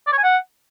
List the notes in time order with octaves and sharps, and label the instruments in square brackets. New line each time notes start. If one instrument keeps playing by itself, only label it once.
[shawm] D5
C#5
G#5
F#5